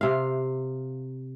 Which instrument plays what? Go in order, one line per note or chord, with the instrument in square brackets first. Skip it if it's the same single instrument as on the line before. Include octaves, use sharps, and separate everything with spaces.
[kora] C3 F5